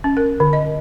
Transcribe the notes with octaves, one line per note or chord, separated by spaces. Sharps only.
C#4
A#4
D3
D#5